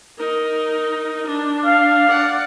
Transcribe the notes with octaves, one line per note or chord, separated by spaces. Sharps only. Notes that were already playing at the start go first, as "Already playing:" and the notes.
D#4 A#4
D4
F5
D5 F#5